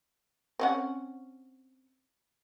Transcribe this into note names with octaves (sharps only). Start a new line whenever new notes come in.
C4 C#4 F#5